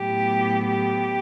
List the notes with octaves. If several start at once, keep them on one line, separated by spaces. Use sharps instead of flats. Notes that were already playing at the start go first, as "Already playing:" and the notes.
Already playing: A2 F#3 B3 G4
G4